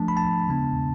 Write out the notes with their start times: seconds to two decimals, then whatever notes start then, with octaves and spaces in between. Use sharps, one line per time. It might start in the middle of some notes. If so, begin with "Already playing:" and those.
Already playing: F3 A3 D4 A5
0.08 B5
0.17 A5
0.49 C#3 G#3 B3 D4